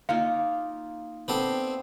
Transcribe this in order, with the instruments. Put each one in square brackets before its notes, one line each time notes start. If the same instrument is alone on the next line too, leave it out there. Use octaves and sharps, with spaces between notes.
[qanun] A#3 D#4 F4 [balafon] F5
[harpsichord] B3 D4 A4 [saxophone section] C4